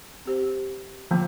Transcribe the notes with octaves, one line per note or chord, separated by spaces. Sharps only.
C4 G4 C5
D3 F3 A#3 F4